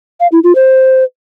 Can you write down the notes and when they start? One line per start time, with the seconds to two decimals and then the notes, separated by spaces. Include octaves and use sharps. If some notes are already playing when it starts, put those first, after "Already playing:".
0.20 F5
0.32 E4
0.44 F4
0.55 C5